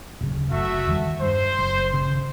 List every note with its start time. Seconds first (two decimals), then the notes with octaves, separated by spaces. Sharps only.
0.21 D1 C#3
0.51 F#1 A3 F#4 E5
0.87 E2 D#3 G3
1.22 G2 C5
1.58 F#1
1.93 G#1 C#3